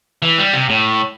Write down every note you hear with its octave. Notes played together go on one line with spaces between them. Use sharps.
E3
G3
C3
A2